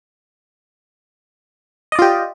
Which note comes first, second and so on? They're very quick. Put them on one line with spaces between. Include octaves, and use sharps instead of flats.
D#5 D5 F4 G4